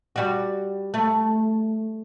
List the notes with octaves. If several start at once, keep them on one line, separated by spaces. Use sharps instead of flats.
G3 F#4
A3